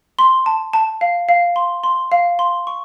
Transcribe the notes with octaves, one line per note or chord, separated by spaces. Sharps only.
C6
A5
A5
F5
F5
C6
C6
F5
C6
C#6